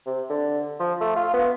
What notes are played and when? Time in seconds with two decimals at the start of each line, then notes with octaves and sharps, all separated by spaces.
0.06 C3
0.29 D3
0.80 F3
1.01 A3
1.16 F4
1.34 B3